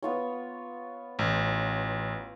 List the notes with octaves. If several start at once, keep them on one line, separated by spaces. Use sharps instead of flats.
B3 F4 C#5
A1